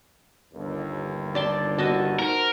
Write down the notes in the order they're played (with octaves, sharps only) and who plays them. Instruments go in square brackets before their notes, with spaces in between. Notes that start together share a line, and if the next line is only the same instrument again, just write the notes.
[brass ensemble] G1 D#2
[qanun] D5 A5 C6
F#4 D#5 A5
[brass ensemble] D#4 C5 [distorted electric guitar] A#4